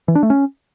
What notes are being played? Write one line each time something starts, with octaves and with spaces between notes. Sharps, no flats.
E3
D4
A3
C#4